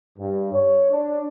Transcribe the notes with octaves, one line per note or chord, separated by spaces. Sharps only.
G2
C#5
D4